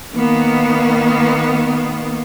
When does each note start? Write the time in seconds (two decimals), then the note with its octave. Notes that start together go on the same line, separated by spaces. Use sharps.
0.14 D#3 A#3 B3